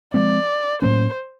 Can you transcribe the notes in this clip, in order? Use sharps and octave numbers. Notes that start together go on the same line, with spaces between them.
F3 G#3 C4 D5
A2 F#3 A#3 C#4 C5